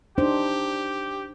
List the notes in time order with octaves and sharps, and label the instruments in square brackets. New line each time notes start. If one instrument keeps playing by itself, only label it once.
[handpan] D4 D#4 C5 [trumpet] G4